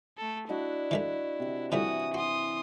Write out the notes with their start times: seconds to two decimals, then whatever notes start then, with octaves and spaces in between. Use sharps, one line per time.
0.18 A3 A4
0.49 D4 E4 F#4 D#5
0.91 E3 G#3 A3
1.40 C3
1.72 E3 F3 G3 A3 F#4 D#6
2.14 F#4 C6 D#6